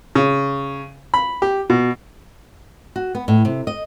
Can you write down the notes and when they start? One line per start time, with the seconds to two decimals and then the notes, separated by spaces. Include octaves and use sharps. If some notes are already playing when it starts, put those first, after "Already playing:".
0.15 C#3
1.14 B5
1.42 G4
1.70 B2
2.96 F#4
3.15 B3
3.28 A2
3.45 C3
3.67 D#5